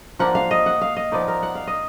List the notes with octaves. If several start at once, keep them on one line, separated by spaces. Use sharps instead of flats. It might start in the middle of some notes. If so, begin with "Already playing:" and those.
F3 A#3 D4 F#5
F5
D#5
F#5
F5
D#5
F3 B3 D#4 D5
A#4
F#5
F5
D#5